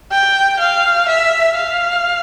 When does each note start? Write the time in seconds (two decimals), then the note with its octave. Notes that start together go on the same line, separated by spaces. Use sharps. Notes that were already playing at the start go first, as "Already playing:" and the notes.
0.11 G5
0.59 F5
1.08 E5
1.56 F5